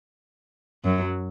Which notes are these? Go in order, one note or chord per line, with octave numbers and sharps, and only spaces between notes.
F#2 F#3